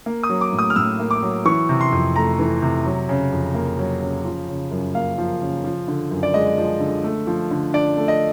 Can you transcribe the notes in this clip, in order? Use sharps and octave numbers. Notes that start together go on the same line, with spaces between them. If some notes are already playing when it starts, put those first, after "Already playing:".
A#3
D#6
F#3
D6
A2
D#6
F6
A2 E6
A#3
D6
F#3
E3 C#6
C3
C6
F2
A3 A#5
E3
C3
F#3
C#3
F2
A#3
F#3
C#3
F3
C#3
F#2
A#3 F5
F3
C#3
F3
D3
F#2
D5
G#3 D#5
F3
D3
A3
F3
D3
D4 D5
A3
D#5